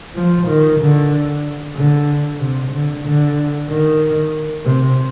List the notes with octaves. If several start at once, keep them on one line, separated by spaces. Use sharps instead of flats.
F3
D#3
D3
D3
C3
D3
D3
D#3
C3